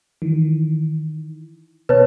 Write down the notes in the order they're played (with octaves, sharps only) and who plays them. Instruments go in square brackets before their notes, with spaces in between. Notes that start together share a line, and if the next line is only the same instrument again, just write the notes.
[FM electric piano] D#3 E3
[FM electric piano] B2 A5 [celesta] B4 C#5